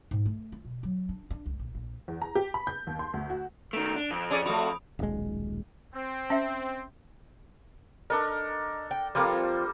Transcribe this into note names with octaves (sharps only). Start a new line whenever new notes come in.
G#2
A3
F4
B2
F#3
D4
D4
C#2
A#1
A#1
E2
A#5
G4
B5
G6
D#2
C6
D2
F#4
D#3 A3 D7 F7
D4
F2
C#4 G#4 D5
A3 F#4 B5 D#6
D#1 B1 G#3
C4
C#4 E5
D4 D#4 A4 A#4
G5
F3 G3 A#3 C4 F4 A4